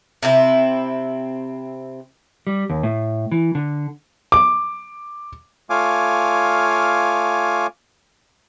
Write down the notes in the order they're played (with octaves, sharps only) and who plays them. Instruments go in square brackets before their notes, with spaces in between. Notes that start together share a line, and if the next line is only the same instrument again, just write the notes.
[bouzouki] C3 C4 E4
[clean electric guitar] G3
D#2
A2
E3
D3
[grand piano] D6
[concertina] A3 F4 C#5 F5 G#5 D6